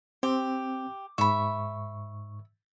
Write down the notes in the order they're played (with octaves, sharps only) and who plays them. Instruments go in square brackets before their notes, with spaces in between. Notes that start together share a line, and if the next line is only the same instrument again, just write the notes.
[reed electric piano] C4 [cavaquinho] G4
[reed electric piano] G#2 C#6 [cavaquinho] E5 B5